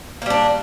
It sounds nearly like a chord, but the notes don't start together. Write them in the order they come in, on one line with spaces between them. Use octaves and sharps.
A#3 G3 D4